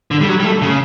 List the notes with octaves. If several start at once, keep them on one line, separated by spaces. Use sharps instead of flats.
D3
G3
F#3
G3
A3
C#3